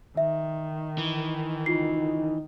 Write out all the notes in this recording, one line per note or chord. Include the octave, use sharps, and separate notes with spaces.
D#3 E5
E3
C#2 D#4 F4 C7